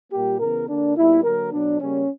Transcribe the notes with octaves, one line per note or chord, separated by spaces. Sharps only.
A#2 G3 A#3 G4
C#3 E3 B3 A#4
D3 A#3 D4
A#2 G3 B3 E4
D3 F#3 A#3 A#4
B2 F#3 B3 D4
C#3 G3 A#3 C#4